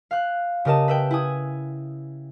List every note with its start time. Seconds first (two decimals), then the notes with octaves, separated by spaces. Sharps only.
0.11 F5 F#6
0.65 C#3 G4 A#4 D#5 A5 E7
0.88 B4 E5 G5
1.11 E4 G#5 D#6